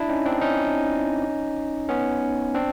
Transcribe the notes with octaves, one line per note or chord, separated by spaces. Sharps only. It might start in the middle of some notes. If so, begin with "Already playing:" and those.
Already playing: D4 E4
C#4 D#4
C4 D4
C#4 D#4
B3 C#4
C4 D4